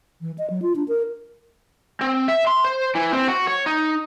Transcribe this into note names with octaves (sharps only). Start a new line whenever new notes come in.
E3
D#5
F#3
F4
D4
A#4
C4
E5
C6
C5
E3
C4
F#4
C#5
D#4